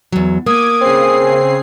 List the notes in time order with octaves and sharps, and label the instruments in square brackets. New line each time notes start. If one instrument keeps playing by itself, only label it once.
[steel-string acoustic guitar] E2 F#3
[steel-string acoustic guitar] A#3 [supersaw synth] D6 G#6 [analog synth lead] D#6
[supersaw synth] C#3 G#4 C7 [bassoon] C4